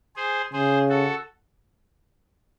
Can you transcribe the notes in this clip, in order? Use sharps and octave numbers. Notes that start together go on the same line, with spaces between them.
G#4 C5
C#3 G#4 C5
F#4 A4